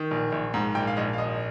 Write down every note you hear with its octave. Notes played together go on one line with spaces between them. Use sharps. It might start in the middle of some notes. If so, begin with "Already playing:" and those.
Already playing: D#3
A#1
A#1
G#2
A#1 G5
F5
A#1 D#5
F5
G#1 D#5